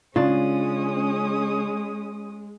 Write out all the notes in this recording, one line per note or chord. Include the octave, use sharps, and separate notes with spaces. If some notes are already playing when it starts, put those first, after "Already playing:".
C#3 G#3 C#4 D4 F4 D#6